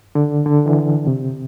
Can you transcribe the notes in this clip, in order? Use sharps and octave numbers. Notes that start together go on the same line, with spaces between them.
D3
D3
E3
C3